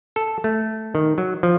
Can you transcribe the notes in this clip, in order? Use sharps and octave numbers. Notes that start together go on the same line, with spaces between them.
A4
A3
D#3
F#3
F3